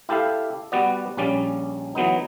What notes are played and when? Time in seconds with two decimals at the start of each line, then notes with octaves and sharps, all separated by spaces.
0.09 E4 G4 A4 E5 F5
0.72 G3 B3 F#4 D5
1.17 A#1 G3 C#4 D5
1.95 E3 F#3 B3 D#4